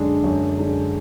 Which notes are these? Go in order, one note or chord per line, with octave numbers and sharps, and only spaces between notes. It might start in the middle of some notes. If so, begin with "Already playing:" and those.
Already playing: F#2 D3 G#3 D4 G#4
F#2
D3 G#3 D4